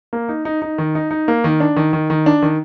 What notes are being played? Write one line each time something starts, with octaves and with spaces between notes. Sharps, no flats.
A#3
D#4
D#4
D#4
D#3
D#4
D#4
A#3
D#3
D4
D#3
D#3
D#3
D4
D#3